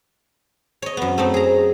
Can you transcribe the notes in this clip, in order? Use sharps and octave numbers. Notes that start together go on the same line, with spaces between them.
C#5 D#5
F#2 B3
A3 C4 D#4
G#4 A#5